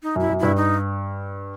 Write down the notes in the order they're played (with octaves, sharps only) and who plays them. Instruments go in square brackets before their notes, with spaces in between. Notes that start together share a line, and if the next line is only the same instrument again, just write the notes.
[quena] D#4
[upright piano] F#2 [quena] E4
[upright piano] F#2
[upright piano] G2 [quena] E4
[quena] D#4